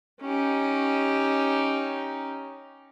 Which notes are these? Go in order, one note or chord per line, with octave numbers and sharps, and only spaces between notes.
C#4 D#4 G4